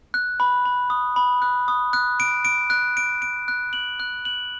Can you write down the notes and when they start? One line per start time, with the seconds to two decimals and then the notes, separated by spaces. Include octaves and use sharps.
0.14 F#6
0.40 B5
0.65 B5
0.90 D#6
1.16 B5
1.42 F#6
1.68 D#6
1.93 F#6
2.20 D7
2.45 D7
2.70 F#6
2.97 D7
3.22 D7
3.48 F#6
3.73 F#7
4.00 F#6
4.25 F#7